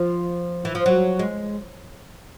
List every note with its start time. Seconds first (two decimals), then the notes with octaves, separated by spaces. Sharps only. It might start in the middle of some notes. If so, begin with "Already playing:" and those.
Already playing: F3
0.65 E3
0.75 F3
0.86 F#3
1.19 G#3